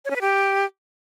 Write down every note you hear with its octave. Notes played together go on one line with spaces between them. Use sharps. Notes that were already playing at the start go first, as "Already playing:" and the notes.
C#5
C#4
B4
G4